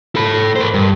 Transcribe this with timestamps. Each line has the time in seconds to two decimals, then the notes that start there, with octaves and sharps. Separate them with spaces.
0.16 A4 B5
0.56 A#4 C5
0.74 G2